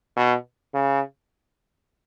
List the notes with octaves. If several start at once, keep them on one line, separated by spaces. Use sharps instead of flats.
B2
C#3